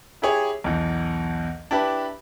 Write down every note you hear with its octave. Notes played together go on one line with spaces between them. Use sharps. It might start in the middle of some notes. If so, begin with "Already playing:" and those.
E4 G4 G#4 C#5
B1 E2
D4 E4 G4 B4 A5